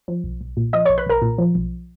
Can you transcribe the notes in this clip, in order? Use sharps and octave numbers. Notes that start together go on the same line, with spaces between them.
F3
B1
B1
A#2
F3 D#5 D#6
C#5 C#6
B1
B4 B5
B1 A#4 A#5
A#2
F3
B1